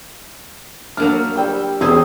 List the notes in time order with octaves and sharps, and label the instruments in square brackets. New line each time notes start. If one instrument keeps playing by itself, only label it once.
[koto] F#3 A#3 D4 [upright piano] F6
[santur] G3 G5 E6
[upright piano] E1 [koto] C4 C#4 G#4